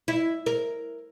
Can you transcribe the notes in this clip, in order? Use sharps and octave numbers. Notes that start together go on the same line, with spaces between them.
E4
A#4